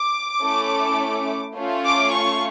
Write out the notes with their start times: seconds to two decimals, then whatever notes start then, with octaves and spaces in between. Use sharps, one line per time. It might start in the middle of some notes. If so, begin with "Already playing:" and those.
Already playing: D6
0.42 A3 C#4 E4 A4
1.56 A3 C#4 F4
1.84 D6
2.12 C#6